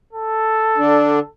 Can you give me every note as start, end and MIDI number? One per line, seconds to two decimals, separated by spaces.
0.13 1.29 69
0.78 1.19 50
0.78 1.19 62